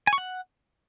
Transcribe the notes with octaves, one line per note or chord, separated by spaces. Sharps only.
G#5
C#6
F#5